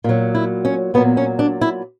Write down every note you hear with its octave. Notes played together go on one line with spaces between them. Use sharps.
A#2 F#3
E4
C#4
A#2 F#3 B3
C#4
D4
E4